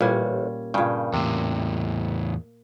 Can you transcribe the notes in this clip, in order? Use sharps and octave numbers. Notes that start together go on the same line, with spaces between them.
A1 A#2 G3 C#4
G2 A#2 C#3 G5
E2 A2 C3